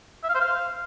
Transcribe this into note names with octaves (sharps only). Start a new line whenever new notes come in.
E5
F5
C5
F5